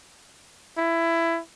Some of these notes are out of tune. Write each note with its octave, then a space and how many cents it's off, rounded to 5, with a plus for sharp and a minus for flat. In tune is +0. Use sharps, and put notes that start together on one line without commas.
E4 +15